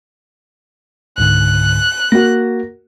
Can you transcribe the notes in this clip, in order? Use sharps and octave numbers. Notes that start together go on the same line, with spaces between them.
C#2 G#2 D3 F#6
A#3 F#4 A#6